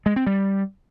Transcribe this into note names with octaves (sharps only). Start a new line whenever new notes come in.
G#3
C4
G3